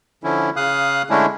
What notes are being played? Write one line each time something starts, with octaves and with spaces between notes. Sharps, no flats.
D3 F3 C#4 E4
C#3 F5 D#6 F#6
D3 G#3 A3 C#4 D4 E4